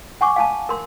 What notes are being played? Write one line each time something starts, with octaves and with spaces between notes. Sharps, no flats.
F#5 G#5 C#6 D6
F5 G#5 A5
A#4 C6